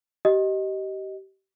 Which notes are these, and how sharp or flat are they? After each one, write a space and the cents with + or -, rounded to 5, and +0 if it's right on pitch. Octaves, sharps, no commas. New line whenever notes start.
G4 -25 D#5 +5